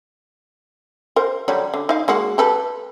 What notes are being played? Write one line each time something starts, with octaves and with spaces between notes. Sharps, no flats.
A#4 C5
D3 F#3 G3
D3
D#4 F5
G#3 A#3 F#4
G4 A4 B4